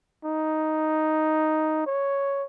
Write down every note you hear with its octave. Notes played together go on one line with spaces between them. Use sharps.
D#4
C#5